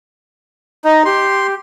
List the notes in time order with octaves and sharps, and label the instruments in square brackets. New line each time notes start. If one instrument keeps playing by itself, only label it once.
[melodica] D#4 [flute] D#5
[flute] G4 [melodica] C6